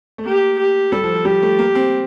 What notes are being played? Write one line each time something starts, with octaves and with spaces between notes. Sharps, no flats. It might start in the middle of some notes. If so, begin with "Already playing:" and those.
A3
A#3 G4
G4
G3 A4
F3
F3
G3 G4
A3
A#3
C4